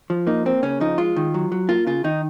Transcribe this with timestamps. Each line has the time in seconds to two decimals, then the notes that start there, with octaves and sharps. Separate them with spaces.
0.10 F3
0.27 A#3 D#4
0.46 A#3 C4
0.63 C#3 C#4
0.80 F3 D#4
0.98 G#3 F4
1.16 D#3
1.34 F#3
1.52 F#3
1.69 A#3 F4
1.87 C#3 F4
2.04 D#3 D#4